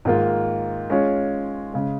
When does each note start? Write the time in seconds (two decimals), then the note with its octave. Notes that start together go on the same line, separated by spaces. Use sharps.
0.05 G#2 D#3 A#3 F4
0.90 G#3 C#4 F4 C#5
1.73 C#3 G#3